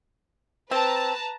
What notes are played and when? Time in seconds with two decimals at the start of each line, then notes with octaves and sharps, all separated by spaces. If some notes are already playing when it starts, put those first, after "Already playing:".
0.71 C4 B4 A5 A#5